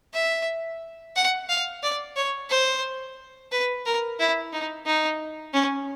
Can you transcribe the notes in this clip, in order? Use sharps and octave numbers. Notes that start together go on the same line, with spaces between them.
E5
F#5
F5
D5
C#5
C5
B4
A#4
E4
D#4
D#4
C#4